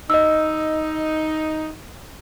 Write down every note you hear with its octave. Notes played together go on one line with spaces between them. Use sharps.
D#4 D#5 E6